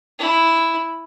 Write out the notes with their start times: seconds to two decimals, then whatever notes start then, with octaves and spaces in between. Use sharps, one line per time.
0.19 E4